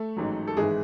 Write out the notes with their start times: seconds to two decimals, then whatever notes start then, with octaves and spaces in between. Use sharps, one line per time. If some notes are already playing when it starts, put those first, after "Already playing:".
Already playing: A3 A4
0.17 A1 G#2 F#3
0.47 A4
0.57 G#1 G#2 E3 G#3 G#4